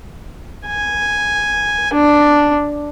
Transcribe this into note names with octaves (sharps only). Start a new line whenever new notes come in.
G#5
D4